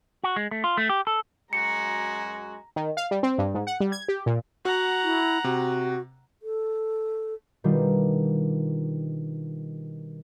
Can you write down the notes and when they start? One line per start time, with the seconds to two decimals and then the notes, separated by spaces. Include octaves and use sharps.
0.24 F#4
0.36 G#3
0.51 A3
0.64 F4
0.77 A3
0.89 G4
1.07 A4
1.53 F#2 G#3 F#4 A#5 C#7
2.76 D#3
2.97 F5
3.11 G3
3.23 C4
3.38 G2
3.54 G#2
3.67 F#5
3.80 G3
3.92 G#6
4.08 G4
4.26 A#2
4.65 F#4 F#5 A#5
5.04 E4
5.44 C3 F#4
6.43 A4
7.64 B2 D#3 G3 D4 F4